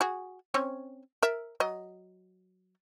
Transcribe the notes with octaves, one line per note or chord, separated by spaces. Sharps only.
F#4 G#4
C4 C#4 C#5
A#4 E5
F#3 D#5